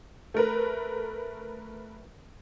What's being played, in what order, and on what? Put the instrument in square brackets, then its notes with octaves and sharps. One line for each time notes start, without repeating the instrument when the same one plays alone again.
[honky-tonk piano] A3 A#4 B4